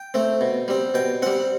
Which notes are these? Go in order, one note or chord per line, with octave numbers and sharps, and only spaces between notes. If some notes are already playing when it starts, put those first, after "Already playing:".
Already playing: G5
A3 C4
B2
G3 C4
B2 G5
G3 C4 F#5